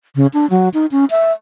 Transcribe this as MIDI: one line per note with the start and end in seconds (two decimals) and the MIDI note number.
0.16 0.27 49
0.34 0.48 62
0.50 0.69 54
0.74 0.86 63
0.92 1.05 61
1.11 1.32 76